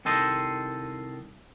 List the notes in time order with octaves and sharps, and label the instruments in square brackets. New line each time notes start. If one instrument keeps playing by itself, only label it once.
[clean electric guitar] C2 D#3 A4 C5 D#5